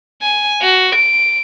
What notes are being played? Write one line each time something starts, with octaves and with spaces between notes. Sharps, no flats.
G#5
F#4
D7